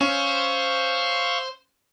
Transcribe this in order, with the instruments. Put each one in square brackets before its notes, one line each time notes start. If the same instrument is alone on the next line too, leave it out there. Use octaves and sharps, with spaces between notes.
[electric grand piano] C#4 [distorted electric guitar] C5 [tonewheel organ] F5 C#6 E6